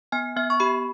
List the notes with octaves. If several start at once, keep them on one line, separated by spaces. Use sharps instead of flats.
B3 G#5
B3 E5
C#6
G4 B5